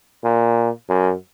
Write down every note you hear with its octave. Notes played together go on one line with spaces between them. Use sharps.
A#2
F#2